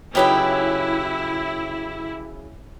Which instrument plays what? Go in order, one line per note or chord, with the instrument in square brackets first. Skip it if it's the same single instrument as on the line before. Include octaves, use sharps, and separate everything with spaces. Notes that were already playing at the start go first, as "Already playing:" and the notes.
[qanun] C#3 F#3 D#4 [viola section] E4 [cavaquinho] G4 B4 G5